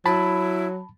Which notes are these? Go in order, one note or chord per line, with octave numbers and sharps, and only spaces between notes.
F#3 E4 A5 B5